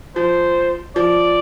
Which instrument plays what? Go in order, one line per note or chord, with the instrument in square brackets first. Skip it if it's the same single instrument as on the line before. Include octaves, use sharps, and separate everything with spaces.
[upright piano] F3 [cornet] C5
[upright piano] F3 [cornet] D5